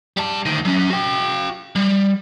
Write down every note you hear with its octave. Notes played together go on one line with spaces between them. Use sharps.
G3 A5
D2 D#3
F#3 C#4
F#4 G5
G3